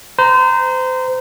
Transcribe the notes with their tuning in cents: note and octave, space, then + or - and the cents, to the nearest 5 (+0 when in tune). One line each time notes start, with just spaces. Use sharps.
C5 -30 A#5 +0